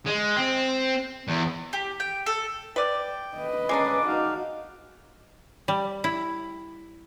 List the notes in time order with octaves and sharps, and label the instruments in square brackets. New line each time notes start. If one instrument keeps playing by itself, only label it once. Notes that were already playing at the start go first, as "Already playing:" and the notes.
[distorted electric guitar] G#3
C4
E2
[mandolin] G4
G5
A4
[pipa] B4 D5 [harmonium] G5
[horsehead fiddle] B4 D#5
[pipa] G#3 A#3 D4 [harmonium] C#4 [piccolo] D6
[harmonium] D#4 F5 [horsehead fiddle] F#4
[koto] G3
E4